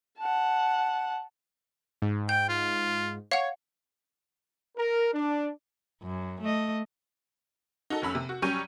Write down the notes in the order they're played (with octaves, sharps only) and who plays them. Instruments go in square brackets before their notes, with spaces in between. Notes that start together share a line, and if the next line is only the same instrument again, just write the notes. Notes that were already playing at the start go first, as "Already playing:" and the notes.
[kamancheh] F#5 A5
[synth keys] G#2
[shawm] G5 [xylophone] G6
[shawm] F4
[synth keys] C#5 [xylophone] F5 F#5
[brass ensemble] A#4
D4
[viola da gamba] F#2
A3 D#5
[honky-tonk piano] D#4 F#4 A4
F1 C#4 B5 E6
C3
F#4
F#3 G3 C#4 C#6 G6 D#7